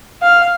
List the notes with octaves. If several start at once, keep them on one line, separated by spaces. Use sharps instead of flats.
F5